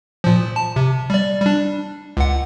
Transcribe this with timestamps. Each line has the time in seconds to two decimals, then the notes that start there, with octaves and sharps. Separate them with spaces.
0.24 A#2 F3
0.56 A5
0.76 C3
1.10 G3 D5
1.42 G3 D4
2.17 C#2 F#5